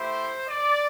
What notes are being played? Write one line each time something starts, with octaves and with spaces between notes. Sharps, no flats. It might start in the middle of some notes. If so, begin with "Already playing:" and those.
Already playing: A3 E4 G4 C5
D5